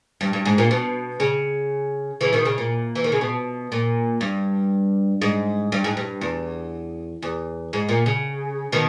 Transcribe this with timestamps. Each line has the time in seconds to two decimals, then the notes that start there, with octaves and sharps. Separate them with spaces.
0.21 G2
0.33 G2
0.45 G#2
0.58 A#2
0.71 B2
1.20 C#3
2.21 C#3 E3
2.33 B2 D#3
2.45 C#3
2.58 A#2
2.95 E3
3.04 D#3
3.12 C#3
3.21 B2
3.72 A#2
4.21 G2
5.22 G#2
5.72 G2
5.84 G#2
5.97 G2
6.21 E2
7.22 E2
7.73 G#2
7.89 A#2
8.06 C#3
8.72 B2 D#3